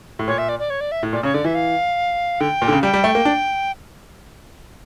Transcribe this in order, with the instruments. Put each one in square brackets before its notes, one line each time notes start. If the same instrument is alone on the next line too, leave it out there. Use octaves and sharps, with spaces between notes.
[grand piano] A2
[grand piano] A#2 [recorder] C#5
[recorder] E5
D5
D5
C#5
D5
E5
[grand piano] A2
[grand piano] A#2 [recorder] D5
[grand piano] C#3 [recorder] C#5
[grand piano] D3 [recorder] D5
[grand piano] E3 [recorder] E5
[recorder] F5
[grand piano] D3 [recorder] G5
[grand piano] A#2
D3
C#3
[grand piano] G3 [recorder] G5
[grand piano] G3
A3
A#3
D4